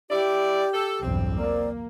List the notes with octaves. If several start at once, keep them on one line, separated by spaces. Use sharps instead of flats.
E4 G4 D5
A4
B1 E2 G2 C4
A#3 D5